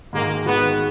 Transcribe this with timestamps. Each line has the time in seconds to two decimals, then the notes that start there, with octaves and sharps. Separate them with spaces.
0.13 G#2 D#3 G#3 A#3 D#4 F#4
0.46 G#2 D#3 G#3 B3 D#4 F#4